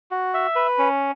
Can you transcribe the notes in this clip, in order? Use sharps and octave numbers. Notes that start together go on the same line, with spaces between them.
F#4
E5
B4
C#4